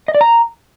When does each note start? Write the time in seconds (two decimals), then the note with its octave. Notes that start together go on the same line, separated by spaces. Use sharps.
0.08 D#5
0.15 D5
0.21 A#5